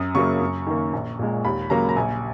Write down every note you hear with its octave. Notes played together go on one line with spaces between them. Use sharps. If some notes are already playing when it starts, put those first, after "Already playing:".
Already playing: F#2 D#6
C#3 F#3 A#3 C#6
F#2
D#3 A#3
A#1
A#2 G#3
D#2 B5
C#3 F#3 A#3 A#5
A#5
A#1 G#5